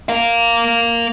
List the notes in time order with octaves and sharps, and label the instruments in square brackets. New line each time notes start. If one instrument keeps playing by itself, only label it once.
[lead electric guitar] A#4 F5